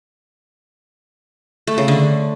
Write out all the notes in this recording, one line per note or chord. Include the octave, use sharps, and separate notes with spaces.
A3
C#3
D3